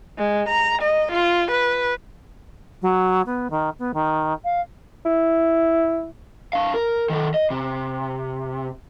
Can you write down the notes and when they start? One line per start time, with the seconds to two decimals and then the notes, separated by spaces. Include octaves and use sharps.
0.18 G#3
0.49 A#5
0.82 D#5
1.12 F4
1.51 B4
2.82 F#3
3.26 B3
3.50 D#3
3.79 B3
3.94 D#3
4.44 F5
5.06 E4
6.53 D4 F5
6.74 A#4
7.10 D#3 A4
7.34 D#5
7.50 C3